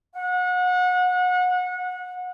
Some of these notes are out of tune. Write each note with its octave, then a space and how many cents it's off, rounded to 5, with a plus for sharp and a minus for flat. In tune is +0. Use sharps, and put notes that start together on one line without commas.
F#5 -30